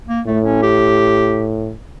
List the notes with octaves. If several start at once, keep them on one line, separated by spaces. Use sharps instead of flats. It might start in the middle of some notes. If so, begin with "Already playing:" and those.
A#3
A2 A3
C#4
G4